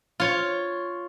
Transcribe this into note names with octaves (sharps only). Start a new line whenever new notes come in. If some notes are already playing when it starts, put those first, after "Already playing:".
F4 C#5